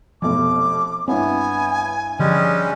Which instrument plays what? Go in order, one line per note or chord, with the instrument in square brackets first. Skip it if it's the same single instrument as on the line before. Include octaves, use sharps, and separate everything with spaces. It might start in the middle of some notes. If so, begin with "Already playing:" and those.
[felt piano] F1 F2 B2 [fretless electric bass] F3 B3 [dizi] D6
[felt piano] G2 E4 C#5 [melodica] B3 [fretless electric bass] C4 [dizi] G#5
[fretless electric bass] D3 F3 [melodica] G3 G#3 C#4